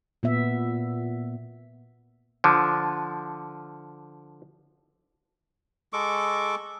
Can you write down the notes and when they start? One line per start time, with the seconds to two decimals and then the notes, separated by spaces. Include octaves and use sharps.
0.23 A#2 B3 E5
2.44 D3 F3
5.93 G#3 A4 C#6 D6